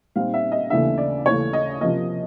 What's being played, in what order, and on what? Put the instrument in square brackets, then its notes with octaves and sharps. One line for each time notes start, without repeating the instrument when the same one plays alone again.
[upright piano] A#2 G3 C4 D#4 F5
E5
D#5
D#2 C#3 E3 A3 D4 E5
D5
D#2 C#3 E3 A3 C#5
D#5
C3 F3 A#3 D#5